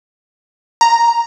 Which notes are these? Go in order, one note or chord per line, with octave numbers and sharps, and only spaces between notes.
A#5